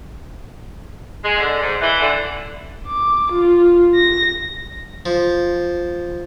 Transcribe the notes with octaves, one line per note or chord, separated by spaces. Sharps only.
G#3
D3
G#2
E3
D3
D6
F4
A#6
F3